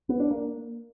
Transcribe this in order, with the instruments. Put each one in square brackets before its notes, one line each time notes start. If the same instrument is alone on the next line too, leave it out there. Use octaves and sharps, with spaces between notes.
[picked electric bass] B3
D4
A#3